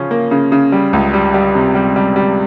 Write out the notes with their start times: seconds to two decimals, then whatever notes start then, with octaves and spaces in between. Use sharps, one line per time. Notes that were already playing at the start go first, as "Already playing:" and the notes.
Already playing: C#3 F3 C#4
0.11 A#3
0.31 C#3
0.52 C#3
0.72 G3
0.93 C#2
1.14 G3
1.34 G3
1.55 C3
1.75 G3
1.96 G3
2.16 G3